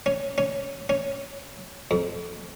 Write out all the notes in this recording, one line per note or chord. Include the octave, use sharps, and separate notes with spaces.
C#4
C#4
C#4
F2